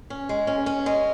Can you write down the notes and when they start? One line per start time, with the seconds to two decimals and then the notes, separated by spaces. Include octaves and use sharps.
0.10 C#4
0.29 G#3
0.47 C#4
0.66 C#4
0.86 G#3